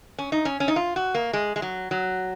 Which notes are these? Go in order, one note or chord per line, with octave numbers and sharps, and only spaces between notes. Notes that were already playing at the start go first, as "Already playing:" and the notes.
C#4
D#4
C#4
C#4
D#4
F4
F#4
A#3
G#3
G#3
F#3
F#3